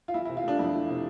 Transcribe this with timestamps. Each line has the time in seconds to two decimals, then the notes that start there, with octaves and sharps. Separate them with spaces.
0.08 F4
0.14 E3 E4
0.25 E4
0.29 C3
0.37 F4
0.44 A3 D4
0.59 F2 E4
0.74 E3
0.89 C3